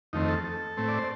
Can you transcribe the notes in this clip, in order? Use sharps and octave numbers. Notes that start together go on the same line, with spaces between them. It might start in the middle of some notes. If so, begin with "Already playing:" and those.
F2 D#3 A3 C4 D#4
A4
A4
A2 A3 C4
D5
C5